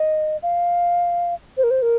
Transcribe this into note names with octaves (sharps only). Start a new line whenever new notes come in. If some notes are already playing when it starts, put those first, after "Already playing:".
Already playing: D#5
F5
C5
A#4
C5
A#4